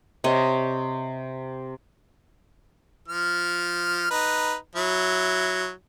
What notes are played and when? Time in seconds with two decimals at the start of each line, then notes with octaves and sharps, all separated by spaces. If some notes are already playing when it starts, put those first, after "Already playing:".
0.24 C3 C#5 D#5
3.08 F3 F6
4.11 D#4 B4
4.75 F#3 E4